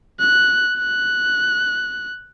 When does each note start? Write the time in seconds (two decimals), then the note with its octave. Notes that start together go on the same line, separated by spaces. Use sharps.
0.20 F#6
0.78 F#6